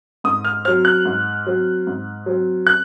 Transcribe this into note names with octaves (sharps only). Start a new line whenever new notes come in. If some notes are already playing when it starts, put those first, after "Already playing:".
G#2 D#6
F6
F#3 C4 F6
F#6
G#2
F#3 C4
G#2
F#3 C4
F#6